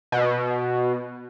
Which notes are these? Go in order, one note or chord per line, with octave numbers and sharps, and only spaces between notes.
B2